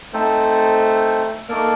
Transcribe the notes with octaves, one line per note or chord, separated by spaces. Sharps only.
A3 C4 D#4 A4 C5
A3 A#3 D#4 A4 D5